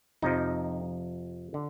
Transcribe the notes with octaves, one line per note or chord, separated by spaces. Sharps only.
F2 C3 F3 D#4
D3